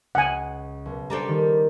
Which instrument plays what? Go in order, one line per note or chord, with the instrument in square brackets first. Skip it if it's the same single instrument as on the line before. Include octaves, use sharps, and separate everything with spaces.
[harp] C#2 [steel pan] F#5 G#5
[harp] B1
[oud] G3 D4 A4 [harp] C5 A#5
[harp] D#3